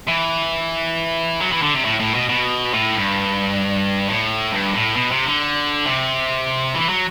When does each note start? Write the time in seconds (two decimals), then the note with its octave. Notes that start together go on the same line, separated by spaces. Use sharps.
0.08 E3
1.41 F#3
1.52 E3
1.63 D3
1.75 C3
1.85 A2
2.00 A2
2.15 B2
2.29 B2
2.74 A2
2.96 G2
4.08 A2
4.52 G2
4.74 A2
4.96 B2
5.12 C3
5.27 D3
5.85 C3
6.74 E3
6.89 F#3